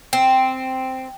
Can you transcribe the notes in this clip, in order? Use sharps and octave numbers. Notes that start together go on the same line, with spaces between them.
C4